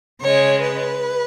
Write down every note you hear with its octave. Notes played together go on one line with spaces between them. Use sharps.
C#3 G#3 C#5
B4